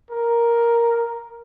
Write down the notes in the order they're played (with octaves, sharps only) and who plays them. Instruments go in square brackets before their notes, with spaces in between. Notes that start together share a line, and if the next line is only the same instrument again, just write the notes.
[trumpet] A#4